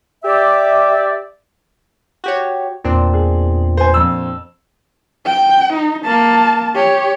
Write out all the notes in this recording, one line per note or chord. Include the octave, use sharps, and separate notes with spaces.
G4 D5 E5
F#4 G4 C#5
E2 A#2 C4 D4
G#4
C5 G#5
F2 E6
G5
D#4
A#3 A5
G4 C#5